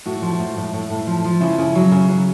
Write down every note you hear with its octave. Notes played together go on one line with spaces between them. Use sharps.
A2 F#4
F3
A2
A2
A2
A2
F3
F3
C#3 E4
C#3
F#3
C#3
F#3